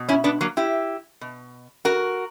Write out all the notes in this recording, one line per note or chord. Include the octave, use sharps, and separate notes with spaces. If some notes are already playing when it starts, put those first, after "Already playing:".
Already playing: B2
C#4 E4
B3 D4
F#3 A#3
E4 G4
B2
F#4 A#4